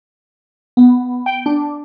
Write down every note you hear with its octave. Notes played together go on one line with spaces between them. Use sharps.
B3
G5
D4